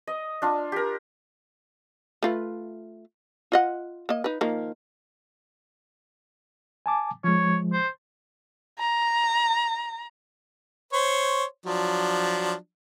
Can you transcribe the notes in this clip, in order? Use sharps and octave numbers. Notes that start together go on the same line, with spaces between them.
D#5
D4 F4
G4 A#4
A3 F4 B4
F4 D#5 F#5
A#3 D#5
D#4 B4
D#3 F3 A#3
G#5 A5 D6
F3 G#3 C#5
C5
A#5
C5 C#5
F3 F#3 D4